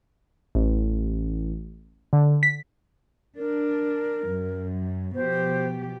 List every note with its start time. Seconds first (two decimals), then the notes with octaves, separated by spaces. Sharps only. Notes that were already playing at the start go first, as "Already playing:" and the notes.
0.55 A1
2.13 D3
2.43 B6
3.37 D4 A#4
4.27 F#2
5.15 B2 F3 G4 C5